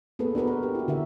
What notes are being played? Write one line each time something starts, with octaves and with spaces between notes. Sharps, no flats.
A#3 B3 G#4 A4 B4
D4 F#4 A#4 B4
A#4
G4
E4 F#4
D3 F#4 A#4 E5